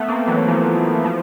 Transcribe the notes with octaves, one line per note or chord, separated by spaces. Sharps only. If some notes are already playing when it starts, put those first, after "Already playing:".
Already playing: A3 B3
A#3 C4
E3 F#3
F3
F3